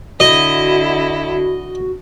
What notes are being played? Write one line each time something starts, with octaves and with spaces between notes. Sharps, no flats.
D3 E4 F#4 D#5